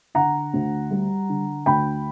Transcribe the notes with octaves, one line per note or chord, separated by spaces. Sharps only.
D3 F#5 A#5
D2
G3
D3
D2 G5 B5